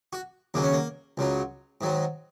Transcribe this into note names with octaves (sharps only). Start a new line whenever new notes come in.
F#4
D#2 C#3 F#3 A#3
C#4
A#3
C#2 C#3 F#3
G#2 D#3 F#3